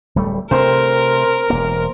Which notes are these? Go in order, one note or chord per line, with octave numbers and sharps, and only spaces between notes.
D1 G3 A3
C3 A3 A#4 C5
E1 A#3